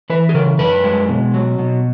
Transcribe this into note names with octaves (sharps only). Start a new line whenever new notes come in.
E3 B4
G#4
C#3 A#4
F#2 B4
G#3
B2
F#3
B2